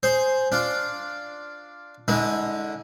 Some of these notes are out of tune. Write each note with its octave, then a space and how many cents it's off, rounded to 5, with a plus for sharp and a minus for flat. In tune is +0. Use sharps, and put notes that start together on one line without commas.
G#4 +5 C5 +0
D4 +0 F4 +0
D3 +0 G#3 +0 E4 -45